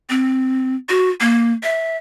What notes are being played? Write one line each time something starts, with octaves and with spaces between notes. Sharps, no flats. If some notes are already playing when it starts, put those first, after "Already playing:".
C4
F#4
A#3
E5